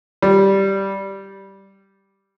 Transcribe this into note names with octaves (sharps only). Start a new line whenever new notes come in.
G3